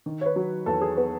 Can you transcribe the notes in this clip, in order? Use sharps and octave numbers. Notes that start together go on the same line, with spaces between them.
D#3
C#5
B4
F#3
E2 A4
G#4
B3 B4